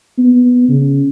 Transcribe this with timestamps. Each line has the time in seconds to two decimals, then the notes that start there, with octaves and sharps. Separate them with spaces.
0.18 B3
0.69 C#3